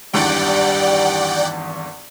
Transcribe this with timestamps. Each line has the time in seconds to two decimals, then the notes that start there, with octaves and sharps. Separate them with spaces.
0.14 G#1 E2 G2 G3 D5 F#5 G5